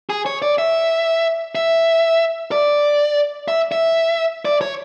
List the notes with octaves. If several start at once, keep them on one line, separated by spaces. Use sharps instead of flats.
G#4
C#5
D5
E5
E5
D5
E5
E5
D5
C#5